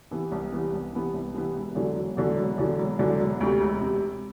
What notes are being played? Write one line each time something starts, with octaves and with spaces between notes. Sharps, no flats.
C3 E3 B3
C2
C3 E3 B3
C2
C3 E3 B3
C2
C3 E3 B3
E1
E2 D3 F#3
E1
E2 D3 F#3
E1
E2 D3 F#3
E1
E2 D3 F#3
E1
D2 C3
E1
C3